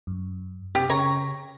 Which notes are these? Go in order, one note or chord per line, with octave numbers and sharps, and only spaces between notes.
F#2
C3 G4
C#3 C#5 A#5